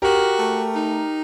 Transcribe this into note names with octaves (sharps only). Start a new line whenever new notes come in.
F#4 G4 A#4
A3
D#4